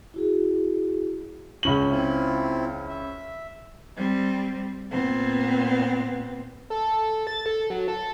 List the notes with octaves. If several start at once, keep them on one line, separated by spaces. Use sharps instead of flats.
E4 F#4 G#4
C#2 C#4 F#7
C4 E4 F4
E5
G3 C4
A#2 B3 C4
A4
A6
A4
F#3
A4